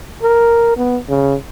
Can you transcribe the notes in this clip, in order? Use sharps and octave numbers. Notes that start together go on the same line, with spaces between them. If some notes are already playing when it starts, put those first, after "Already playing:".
A#4
B3
C#3